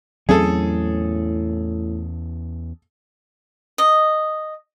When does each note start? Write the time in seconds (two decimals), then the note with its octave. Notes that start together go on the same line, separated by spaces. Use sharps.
0.29 E2 A2 F#3 C4 C#4 G#4 A4
3.78 D#5